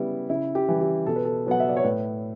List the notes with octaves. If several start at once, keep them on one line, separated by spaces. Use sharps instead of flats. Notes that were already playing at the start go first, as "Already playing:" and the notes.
Already playing: C#3 G3 B3 E4
C#3 E4
G4
E3 G3
G4
B2 A4
B4
A4
F#3 B3 F#5
E5
D5
C#5
A2 B4